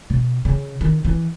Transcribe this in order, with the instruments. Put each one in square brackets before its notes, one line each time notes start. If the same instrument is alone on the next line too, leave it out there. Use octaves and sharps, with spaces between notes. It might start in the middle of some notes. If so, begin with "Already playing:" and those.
[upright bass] B2
C#3
D#3
E3